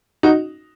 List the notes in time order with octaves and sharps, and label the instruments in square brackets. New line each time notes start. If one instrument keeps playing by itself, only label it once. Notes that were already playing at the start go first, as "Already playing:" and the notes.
[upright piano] D#4 F#4